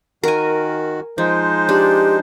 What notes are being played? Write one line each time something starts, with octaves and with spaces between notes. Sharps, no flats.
D#3 F#4 A#4 G#5
F3 G#3 D#4 C5
D4 G4